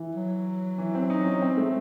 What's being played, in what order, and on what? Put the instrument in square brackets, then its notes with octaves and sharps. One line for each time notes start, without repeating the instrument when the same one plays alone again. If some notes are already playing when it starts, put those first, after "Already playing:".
Already playing: [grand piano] E3
[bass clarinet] F#3
[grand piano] E3
C4
D#4
C#4
C4
A3